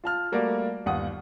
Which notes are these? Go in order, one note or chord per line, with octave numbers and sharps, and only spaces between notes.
F4 A5 F6
G3 A3 A#3 F#4 A#4 D5
G1 D#2 F#5 D#6